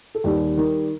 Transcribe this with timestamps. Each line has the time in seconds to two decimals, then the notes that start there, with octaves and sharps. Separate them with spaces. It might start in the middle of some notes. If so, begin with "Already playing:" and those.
0.15 A4
0.24 D#2 G3 G4
0.57 D#3